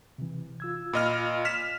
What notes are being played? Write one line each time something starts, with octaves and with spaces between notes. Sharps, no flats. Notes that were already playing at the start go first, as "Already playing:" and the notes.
C3 E3
F4 E6 G#6
A#2 F4 D#5 F5 B5 F6
F6 B6 E7